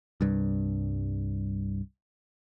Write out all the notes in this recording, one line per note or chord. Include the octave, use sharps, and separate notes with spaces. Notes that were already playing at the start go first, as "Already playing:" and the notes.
C2 G2